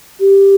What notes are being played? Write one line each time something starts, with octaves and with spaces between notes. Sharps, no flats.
G4